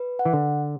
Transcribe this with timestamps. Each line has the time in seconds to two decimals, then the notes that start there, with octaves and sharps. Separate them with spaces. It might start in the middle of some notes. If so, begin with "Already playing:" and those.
Already playing: B4
0.19 F#5
0.25 E3
0.33 D3